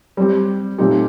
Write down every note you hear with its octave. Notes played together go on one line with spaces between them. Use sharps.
G3 C4 G4
A#2 A3 C4 D#4 G4